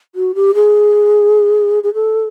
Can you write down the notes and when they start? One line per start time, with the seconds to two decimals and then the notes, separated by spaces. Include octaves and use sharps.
0.15 F#4
0.35 G4
0.55 G#4
1.83 G#4
1.94 A4